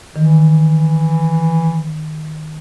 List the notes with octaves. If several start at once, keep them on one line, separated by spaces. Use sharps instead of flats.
D#3 E3